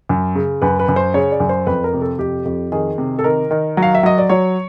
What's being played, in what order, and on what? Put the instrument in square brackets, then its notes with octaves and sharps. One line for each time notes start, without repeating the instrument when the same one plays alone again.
[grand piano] F#2
C#3
F#2 B4
B4
F#2
C5
C#3 C#5
D5
F#2
C5
F2 B4
A#4
C3
A4
F2 G4
F2
D#3 G#4
C3
A4
D#3 A#4
D#3
F#3
F5
E5
F#3 D#5
D5
F#3 C#5